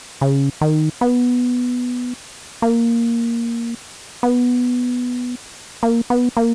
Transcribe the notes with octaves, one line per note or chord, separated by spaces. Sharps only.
C#3
D#3
B3
A#3
B3
A#3
B3
A#3